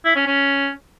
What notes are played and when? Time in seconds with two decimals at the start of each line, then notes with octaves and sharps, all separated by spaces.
0.05 E4
0.16 C#4
0.26 C#4